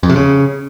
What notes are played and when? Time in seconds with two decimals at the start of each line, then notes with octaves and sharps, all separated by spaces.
0.03 F2
0.10 C3
0.16 C#3